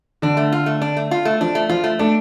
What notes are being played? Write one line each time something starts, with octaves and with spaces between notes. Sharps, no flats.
D3 D4
A3
F4
A3
D4
A3
F4
A3
F3 D4
A3
F3 F4
A3
A3 D4